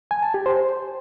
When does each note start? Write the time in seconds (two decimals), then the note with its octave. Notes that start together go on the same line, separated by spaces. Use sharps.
0.11 G#5
0.23 A5
0.34 G4
0.46 C5